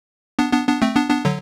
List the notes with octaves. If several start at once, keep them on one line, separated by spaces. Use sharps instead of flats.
B3 D4
B3 D4
B3 D4
A3 C4
B3 D4
B3 D4
D3 F#3